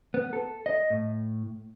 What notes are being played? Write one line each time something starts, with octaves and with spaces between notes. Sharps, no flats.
B3
A4
D#5
A2